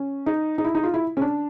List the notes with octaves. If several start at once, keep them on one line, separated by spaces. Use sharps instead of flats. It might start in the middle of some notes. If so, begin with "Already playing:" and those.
Already playing: C#4
D#4
D#4
E4
D#4
F4
E4
C#4
D4